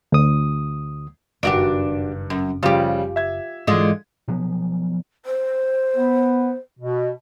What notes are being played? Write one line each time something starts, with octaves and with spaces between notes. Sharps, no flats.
D2 D#6
F#1 G2 D#3 D4 F#4 G4 D7
F#2
C#3 F3 G3 F4 G4
E5 G#6
G#2 D3 E3 G#3 F4
B2 F3 F#3 B3
C5
B3
B2